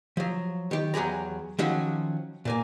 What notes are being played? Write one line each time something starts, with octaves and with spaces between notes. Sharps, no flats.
F3 F#3
D#3 G4
E2 F#3 G4 G#4 A#5
D#3 F3 F#3 C#4 F#4
A#2 A#3 G#5